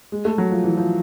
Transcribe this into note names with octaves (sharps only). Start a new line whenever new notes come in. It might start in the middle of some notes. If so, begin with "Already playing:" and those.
G#3
A3
F#3
F3
E3
F3